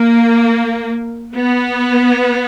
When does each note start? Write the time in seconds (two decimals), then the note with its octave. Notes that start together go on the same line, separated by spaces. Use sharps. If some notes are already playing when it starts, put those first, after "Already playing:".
Already playing: A#3
1.35 B3